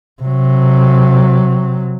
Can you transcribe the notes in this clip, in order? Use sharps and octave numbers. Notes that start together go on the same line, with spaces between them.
C3 F#3